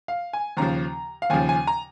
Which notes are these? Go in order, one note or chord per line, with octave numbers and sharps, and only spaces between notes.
F5
G#5
D#2 C#3 F3 A#5
F5
D#2 C#3 F3 G#5
G#5
A#5